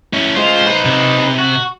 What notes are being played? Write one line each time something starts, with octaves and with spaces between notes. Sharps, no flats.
C#4 E4
G#3 F4 C5
D#4 B4
C3
F#4